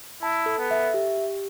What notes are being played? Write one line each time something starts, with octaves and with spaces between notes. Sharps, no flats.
E4 A5
A4
B3
E5
G4
G4